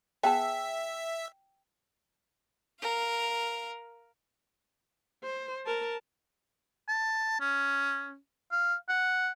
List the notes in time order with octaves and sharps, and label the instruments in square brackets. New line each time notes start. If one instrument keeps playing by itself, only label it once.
[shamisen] B3 G#4 A5 [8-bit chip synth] E5 [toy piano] G5
[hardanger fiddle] A#4 F5
[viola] C5
A#4 A5
[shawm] A5
C#4
F5
F#5